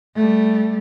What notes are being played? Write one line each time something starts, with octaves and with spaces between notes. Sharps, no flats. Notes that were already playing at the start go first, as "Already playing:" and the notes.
G3 A3